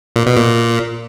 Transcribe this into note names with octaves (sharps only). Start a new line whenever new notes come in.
A#2
B2
A#2